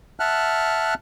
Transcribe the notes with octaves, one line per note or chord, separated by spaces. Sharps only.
E5 F#5 A5 F6 F#6